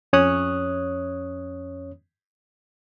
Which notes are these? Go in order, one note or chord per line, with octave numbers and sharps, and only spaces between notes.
F2 C#4 C#5 D#6 F#6